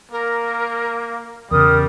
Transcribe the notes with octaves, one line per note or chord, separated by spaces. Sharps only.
A#3 A#4
E2 C#3 G3 A#4 D#6